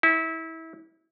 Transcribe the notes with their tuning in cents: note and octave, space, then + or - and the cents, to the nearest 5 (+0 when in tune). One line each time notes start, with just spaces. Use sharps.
E4 -25